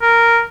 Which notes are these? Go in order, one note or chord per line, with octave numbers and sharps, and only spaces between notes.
A#4